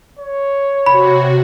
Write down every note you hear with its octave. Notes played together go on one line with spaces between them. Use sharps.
C#5
C3 F#4 B5